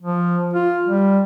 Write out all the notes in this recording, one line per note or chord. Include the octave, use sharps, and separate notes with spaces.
F3
F4
G3